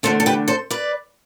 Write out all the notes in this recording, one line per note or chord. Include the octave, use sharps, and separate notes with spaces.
E2 D3 A3 D4 A4 C5
A4
G4 B4
A4 C5
B4 D5